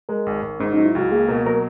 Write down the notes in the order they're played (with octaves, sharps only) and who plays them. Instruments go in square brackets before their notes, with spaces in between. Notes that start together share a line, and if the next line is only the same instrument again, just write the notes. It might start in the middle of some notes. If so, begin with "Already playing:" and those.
[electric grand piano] G#3 [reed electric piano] A#4
[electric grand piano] G#1
G#1
[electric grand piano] G#2 [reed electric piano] C#4
[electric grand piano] F#3 [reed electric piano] D#4
[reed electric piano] E4
[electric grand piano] C#2 [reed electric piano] F#4
[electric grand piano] A#3 [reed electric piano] G#4
[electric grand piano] B2 [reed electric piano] A#4
[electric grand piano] F#3 [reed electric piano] A#4